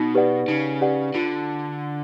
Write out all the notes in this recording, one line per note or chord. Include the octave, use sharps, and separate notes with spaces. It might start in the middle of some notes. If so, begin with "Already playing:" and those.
Already playing: B2 D#4
G4 B4 D5 F#5
C#3 D#4
G4 B4 D5 F#5
D3 F4